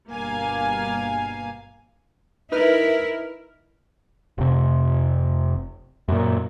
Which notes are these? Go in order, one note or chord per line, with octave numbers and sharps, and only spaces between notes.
G1 G2 B2 A#3 F5 G#5
D#4 E4 A#4 B4 F6
F1 C3
F#2 A#2